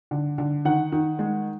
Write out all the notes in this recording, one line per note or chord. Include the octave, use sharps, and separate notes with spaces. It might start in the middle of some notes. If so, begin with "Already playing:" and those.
D3
D3
D#3 F#5
D#3
G#3